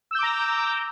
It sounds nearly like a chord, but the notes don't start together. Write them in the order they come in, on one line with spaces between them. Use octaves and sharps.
E6 G6 D6 A#5